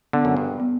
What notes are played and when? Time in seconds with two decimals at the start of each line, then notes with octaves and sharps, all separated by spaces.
0.13 D3 B3
0.25 F#2
0.37 G2
0.60 B3